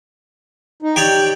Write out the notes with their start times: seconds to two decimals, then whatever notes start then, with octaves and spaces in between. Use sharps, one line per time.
0.82 D#4
0.96 G4 C#5 D5 G5